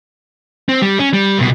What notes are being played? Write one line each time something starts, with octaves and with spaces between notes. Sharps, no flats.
C4
G3
C#4
G3
C2 B2